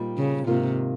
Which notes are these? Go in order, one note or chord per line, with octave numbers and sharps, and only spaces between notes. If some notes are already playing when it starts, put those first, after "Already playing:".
Already playing: A#2 G3 C4 D#4
C#3
G#2 C3 D#3 A#3 F4